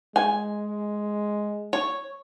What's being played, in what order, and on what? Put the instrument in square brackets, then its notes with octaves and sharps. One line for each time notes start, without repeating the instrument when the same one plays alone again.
[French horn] G#3 [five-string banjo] G#5
[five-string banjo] C#5